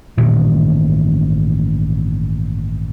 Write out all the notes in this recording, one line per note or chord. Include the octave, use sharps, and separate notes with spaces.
A1 G2 A#2 D#3